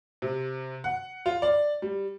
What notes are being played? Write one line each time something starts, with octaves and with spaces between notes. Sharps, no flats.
C3
F#5
F4
D5
G3